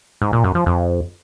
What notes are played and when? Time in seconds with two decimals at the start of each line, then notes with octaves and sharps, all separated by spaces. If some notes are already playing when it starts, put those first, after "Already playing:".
0.22 G#2
0.33 A#2
0.44 F#2
0.55 F3
0.66 F2